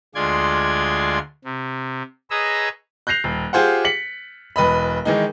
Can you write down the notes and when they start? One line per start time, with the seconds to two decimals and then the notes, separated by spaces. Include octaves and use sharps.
0.15 D2 G#3 F4 D5 C6 G#6
1.44 C3
2.30 G#4 B4 C#5 D#5 A#5 E6
3.07 F#6 G6 A#6 C7 F7
3.24 D#1
3.53 F4 G4 G#4 C5 F5 F#5
3.85 B6 C#7 F#7
4.56 E1 B4 D#5 B5
5.05 D#3 E3 G#3 D#4